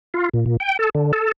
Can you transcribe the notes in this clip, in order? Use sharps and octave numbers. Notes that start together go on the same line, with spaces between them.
F4
A#2
A#2
G5
A4
D3
A4